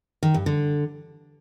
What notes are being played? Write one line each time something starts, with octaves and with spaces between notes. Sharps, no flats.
D#3
G2
D3